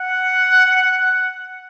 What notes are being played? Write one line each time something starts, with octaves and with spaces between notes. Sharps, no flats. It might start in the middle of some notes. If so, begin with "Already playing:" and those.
Already playing: F#5